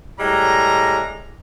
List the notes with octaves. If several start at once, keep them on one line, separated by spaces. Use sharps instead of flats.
A2 G3 G#3 A#5